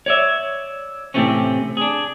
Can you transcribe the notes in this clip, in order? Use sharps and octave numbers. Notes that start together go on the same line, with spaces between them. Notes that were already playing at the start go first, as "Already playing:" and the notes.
C#5 D5 E5
A2 C3 E3 A3 C4 C#4
D4 G#4